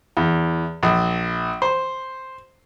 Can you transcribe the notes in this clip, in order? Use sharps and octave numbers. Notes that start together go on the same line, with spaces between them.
E2
A#1
C5